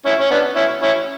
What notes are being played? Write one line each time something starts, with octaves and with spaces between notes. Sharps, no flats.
C#4 E4
C#4
B3 D4
C#4 E4
C#4 E4